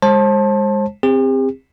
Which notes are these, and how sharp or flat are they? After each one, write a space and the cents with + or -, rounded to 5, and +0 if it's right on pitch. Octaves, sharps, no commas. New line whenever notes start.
G#3 -20 C5 +35 A5 +0
C4 +0 G4 +45